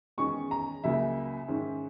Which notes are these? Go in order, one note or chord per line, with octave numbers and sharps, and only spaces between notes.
E2 D#3 G#3 C#4 C#6
A#5
C#2 C#3 F#3 A#3 E5
G#2 D#3 G#3 C#4